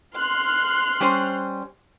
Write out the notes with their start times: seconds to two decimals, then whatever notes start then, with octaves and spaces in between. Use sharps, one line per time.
0.14 C6 F6 F#6
1.00 G3 C#4 C5